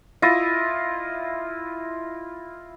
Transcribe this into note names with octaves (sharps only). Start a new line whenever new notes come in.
E4 F4 D#5